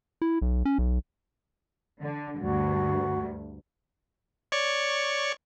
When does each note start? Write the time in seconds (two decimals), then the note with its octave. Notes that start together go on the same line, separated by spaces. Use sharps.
0.22 E4
0.42 B1
0.65 C#4
0.78 B1
2.00 D3
2.40 D2 G2 F#4
4.52 C#5 D5 C#6